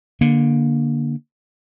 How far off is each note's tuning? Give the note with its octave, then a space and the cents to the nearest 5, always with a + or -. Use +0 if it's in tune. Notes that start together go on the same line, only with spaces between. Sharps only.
D3 +0 A#3 +15